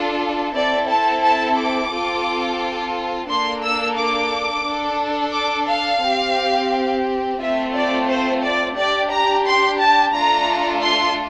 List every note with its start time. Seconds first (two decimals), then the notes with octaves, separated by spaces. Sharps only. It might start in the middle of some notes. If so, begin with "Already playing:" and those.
Already playing: D4 F4 A4
0.55 C4 E4 A4 D5
0.89 A5
1.24 A5
1.58 D6
1.92 C4 F4 A4
3.29 A#3 D4 A4 C6
3.63 E6
3.97 D6
4.66 D4 A4
5.34 D6
5.68 F5
6.03 C4 G4
7.40 A3 C4 F4 A4 E5
7.74 D5
8.08 C5
8.42 D5
8.76 D4 G4 D5
9.11 A#5
9.45 C6
9.79 A5
10.13 A3 D4 F4 A4 A#5
10.82 C6